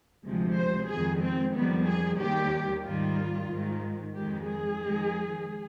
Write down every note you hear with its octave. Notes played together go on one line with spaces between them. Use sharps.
D2 C3 F3 G#3
C5
F2 D#3 G#3 G#4
C4
F2 D#3 G3 B3
G#4
D#2 D#3 G3 G4
G#2 D#3 G3 F4
G#2 D#3 G#3
F2 D#3 G#3 G4
G#4
F2 D#3 G#3